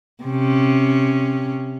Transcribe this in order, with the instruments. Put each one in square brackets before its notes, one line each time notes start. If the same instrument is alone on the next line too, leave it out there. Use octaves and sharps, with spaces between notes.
[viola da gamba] C3 C#4